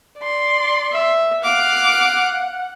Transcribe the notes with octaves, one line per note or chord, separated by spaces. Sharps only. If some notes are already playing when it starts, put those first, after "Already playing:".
D5 C6
E5
F5 F#5 D6